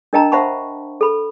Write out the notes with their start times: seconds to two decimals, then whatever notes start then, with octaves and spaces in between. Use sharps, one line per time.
0.13 D4 A#4 D#5 G5 A5 A#5
0.32 C5 E5 F#5 A5 B5 C#6
1.01 A4 B5